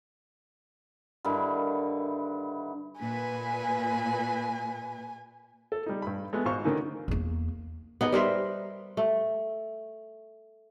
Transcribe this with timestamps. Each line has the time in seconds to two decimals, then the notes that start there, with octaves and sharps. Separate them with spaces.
1.25 G2 D3 D#3 E4
2.99 A#2 B4 G#5
5.72 A4
5.86 G3 D#4
6.02 G2 B5
6.33 G#3 A3 B3
6.45 G#1 G#2 D#4 C5 F5 C#6
6.65 D3 D#3 A#3 C#4 D#4
7.08 E2 A#3
8.01 B3 D#4 G#4
8.12 G3 A#4 C5 E5
8.97 A3